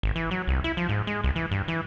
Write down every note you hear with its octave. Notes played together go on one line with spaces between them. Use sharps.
G#1
E3
F#3
C2
E4
F3
G#2
G#3
C2
E3
G2
E3